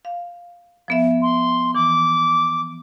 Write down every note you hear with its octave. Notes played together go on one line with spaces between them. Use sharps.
F5
F3 B3 E5
C6
E3 D6